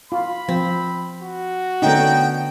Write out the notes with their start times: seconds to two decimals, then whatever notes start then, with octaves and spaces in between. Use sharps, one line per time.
0.12 F4 B5
0.48 F3 C4
1.22 F#4
1.82 D3 A3 B3 C#4 D#4 G5